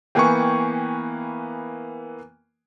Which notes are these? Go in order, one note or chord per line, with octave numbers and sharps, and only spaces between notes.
E3 A#3 B3 G5 G#5 C#6